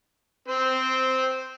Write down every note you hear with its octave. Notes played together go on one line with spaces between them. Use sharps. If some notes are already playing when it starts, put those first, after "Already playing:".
C4 C5